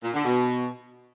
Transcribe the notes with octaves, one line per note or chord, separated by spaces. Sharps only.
A#2
D3
B2